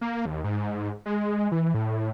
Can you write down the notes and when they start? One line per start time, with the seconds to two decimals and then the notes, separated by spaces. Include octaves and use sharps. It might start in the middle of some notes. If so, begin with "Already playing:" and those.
0.01 A#3
0.26 D#2
0.44 G#2
1.06 G#3
1.52 E3
1.74 A2